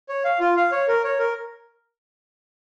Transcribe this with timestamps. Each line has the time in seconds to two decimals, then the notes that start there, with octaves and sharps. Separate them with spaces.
0.09 C#5
0.25 F5
0.40 F4
0.57 F5
0.72 C#5
0.88 A#4
1.04 C#5
1.19 A#4